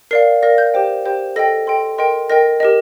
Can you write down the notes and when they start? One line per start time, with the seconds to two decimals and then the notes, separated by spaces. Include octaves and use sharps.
0.11 A#4 D5 F5 C7
0.42 A#4 D5 F5 A#6
0.58 G6
0.74 G4 C5 G5
1.05 G4 C5 G5
1.36 A4 D#5 G5 A#6
1.67 A4 D#5 G5 C6
1.98 A#4 D#5 G5 C6
2.30 A#4 D#5 G5 A#6
2.60 G4 A#4 D#5